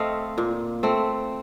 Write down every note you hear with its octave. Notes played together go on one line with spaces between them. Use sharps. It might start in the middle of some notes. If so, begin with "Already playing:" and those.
Already playing: A3 C4 D#5 F5
A#2
A3 C4